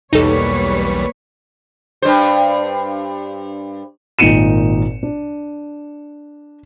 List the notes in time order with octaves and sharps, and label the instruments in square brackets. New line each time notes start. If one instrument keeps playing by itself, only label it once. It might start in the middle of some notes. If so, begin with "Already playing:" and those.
[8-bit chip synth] B1 E2 G3 [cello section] A#3 B4 C#5 [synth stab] D#4 A4
[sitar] G2 C5
[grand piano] G#1 A#2 D#4 C#7 D#7 E7
D4